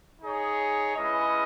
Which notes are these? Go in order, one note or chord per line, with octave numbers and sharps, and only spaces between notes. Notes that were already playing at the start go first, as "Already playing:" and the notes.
D#4 G#4 C#5
G#3 C#4 E4 B4 D#5